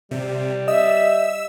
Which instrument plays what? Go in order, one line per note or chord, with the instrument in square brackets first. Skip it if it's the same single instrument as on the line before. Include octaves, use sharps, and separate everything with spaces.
[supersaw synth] C3 [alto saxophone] G3
[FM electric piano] D#5 [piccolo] E5 [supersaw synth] E6